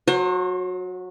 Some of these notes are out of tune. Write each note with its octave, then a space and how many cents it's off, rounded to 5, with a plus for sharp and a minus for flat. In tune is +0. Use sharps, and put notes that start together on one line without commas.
F#3 -20 C5 +35